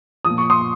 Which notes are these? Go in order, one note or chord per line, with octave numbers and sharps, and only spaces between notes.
A#2 F3 D#6
C#6
C6 D#6